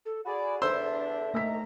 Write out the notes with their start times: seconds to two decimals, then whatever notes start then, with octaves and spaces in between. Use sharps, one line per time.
0.06 A4
0.26 F#4 G#4 D5 B5
0.62 E2 D3 D4 C5 E5 C6 E6
1.34 C2 D#3 A3 A#5 E6 B6